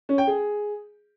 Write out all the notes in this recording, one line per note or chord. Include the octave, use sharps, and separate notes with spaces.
C#4
G5
G#4